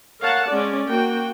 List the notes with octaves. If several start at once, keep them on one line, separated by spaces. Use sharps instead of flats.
A#4 C#5 F5 F#5 A5
G#3 C#4 D5
A#3 F#4 G5